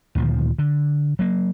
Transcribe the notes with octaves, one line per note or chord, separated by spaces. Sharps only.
D2 A#2 D#3 F3
D3
F#3 A#3